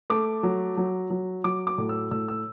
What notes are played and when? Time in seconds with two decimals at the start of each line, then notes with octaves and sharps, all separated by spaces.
0.10 A3 D6
0.43 F#3
0.77 F#3
1.10 F#3
1.44 F#3 D6
1.67 D6
1.78 A2
1.89 E6
2.11 A2 E6
2.28 E6